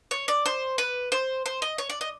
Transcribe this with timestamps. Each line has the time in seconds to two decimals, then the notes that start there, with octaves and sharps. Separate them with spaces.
0.11 C#5
0.28 D5
0.46 C5
0.78 B4
1.12 C5
1.46 C5
1.62 D#5
1.78 C#5
1.90 D5
2.01 D#5